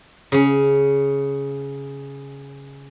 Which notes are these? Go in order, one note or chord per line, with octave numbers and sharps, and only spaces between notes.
C#3 C#4